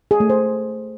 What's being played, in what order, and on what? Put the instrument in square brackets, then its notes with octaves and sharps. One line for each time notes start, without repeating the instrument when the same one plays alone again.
[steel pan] G#4
A3
C5